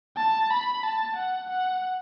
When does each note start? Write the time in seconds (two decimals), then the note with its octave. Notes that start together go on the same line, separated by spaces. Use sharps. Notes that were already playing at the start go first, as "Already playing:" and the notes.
0.17 A5
0.50 B5
0.83 A5
1.16 F#5
1.50 F#5